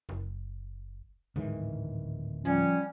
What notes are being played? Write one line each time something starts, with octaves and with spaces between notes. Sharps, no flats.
F#1
D1 G#2 D#3 E3
F3 G3 C#4